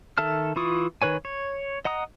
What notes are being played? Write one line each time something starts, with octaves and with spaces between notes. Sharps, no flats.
D#3 A4 E5 A5 F6
E3 E4 F4 C#6 D#6
D#3 B4 C#5 G#5
C#5
D#5 F#5 A#5 D#6